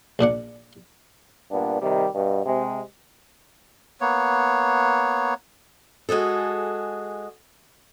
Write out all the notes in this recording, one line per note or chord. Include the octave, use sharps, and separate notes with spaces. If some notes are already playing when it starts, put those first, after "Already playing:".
A#1 A#2 D4 F#5
G2 A#2 B3 D4
C3 D#3 G3
G2 B2
C3 G#3
A#3 B3 C#5
G#3 F#4 G#4 A4